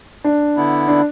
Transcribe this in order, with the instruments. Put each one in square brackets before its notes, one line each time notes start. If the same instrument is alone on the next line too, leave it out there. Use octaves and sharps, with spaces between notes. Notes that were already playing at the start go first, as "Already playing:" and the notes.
[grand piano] D4
[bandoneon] D3 B3 E4
[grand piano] D4